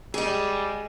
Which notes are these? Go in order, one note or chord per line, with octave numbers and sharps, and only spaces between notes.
G3 G#3 G#4